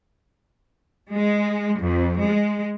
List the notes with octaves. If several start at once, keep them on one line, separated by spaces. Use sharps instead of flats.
G#3
F2
G#3